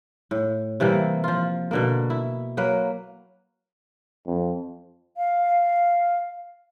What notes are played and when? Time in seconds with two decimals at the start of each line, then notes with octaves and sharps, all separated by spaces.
0.31 A2
0.80 C3 E3 G3 A#3
1.24 F3 F4
1.71 B2 D3 A#3
2.10 E4
2.57 F#3 A#3 B4
4.26 F2
5.16 F5